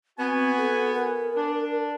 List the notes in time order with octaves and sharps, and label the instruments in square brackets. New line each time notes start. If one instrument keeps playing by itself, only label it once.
[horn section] B3 F#4 G#5 [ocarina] C4
[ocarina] A4
A#4
[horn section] D4